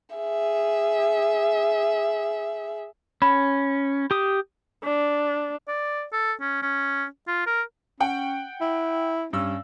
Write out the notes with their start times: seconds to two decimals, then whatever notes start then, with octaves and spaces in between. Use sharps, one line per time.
0.16 G#4 E5
3.22 C#4 B5
4.11 G4 D#6
4.84 D4
5.68 D5
6.13 A4
6.41 C#4
6.62 C#4
7.27 F4
7.46 A#4
8.00 C#4 F#5 G5
8.61 E4
9.33 G2 C#4 E6